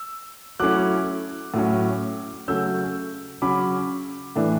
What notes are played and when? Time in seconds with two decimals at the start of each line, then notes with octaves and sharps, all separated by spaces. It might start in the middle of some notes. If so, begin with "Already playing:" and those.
Already playing: E6
0.60 F#3 A3 C#4 E4 D6 F#6
1.54 A2 F#3 C#4
2.48 C#3 F#3 A3 C#4 E6 G6
3.42 C#3 F#3 C#4 B5 D6
4.36 A2 E3 A3 D4